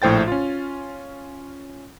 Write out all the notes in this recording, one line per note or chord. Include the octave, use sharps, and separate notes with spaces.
A#1 A2 C5 G5 A6
C#4 F4